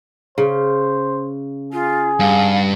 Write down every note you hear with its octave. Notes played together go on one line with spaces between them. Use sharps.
C#3 C5
F4 G#4
G2 F5